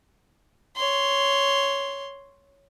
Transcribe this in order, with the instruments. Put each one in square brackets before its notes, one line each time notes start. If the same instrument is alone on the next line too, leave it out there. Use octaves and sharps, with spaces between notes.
[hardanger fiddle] C#5 C6